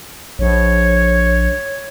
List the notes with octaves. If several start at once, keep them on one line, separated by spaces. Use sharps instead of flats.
A#1 C#5